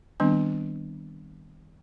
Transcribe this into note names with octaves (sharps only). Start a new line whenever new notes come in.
D#3 G3 B3 C4 D4